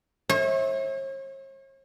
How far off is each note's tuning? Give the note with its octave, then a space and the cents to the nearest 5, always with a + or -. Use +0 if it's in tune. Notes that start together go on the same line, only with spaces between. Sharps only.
C#5 -45 E5 -25